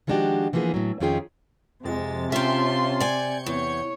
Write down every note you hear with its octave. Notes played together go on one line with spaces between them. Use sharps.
D#3 F3 G#3 D4 F#4 G4
E3 F3 A#3 B3 G#4
A2 F#3
F2 D#3 C#4 F4 G#4 G5
F2 C3 G#3 A6
C#4 F4 E5 G5 A5 C6
D5 G#5 G6 G#6 C#7
E2 C#5